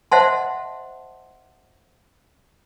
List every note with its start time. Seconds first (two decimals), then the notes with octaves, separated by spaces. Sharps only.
0.12 C5 D#5 E5 F#5 A5 C6